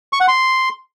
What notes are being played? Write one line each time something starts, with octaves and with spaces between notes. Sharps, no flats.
C#6
F#5
C6